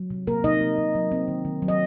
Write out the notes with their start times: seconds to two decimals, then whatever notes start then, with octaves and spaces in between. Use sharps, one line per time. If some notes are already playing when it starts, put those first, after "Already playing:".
Already playing: F#3
0.10 C3
0.27 C3 A#3 A#4
0.44 C3 D#4 D#5
0.61 A#3
0.78 C3
0.95 F#3
1.12 C4
1.28 D#3
1.45 D#3
1.62 F#3
1.68 D#5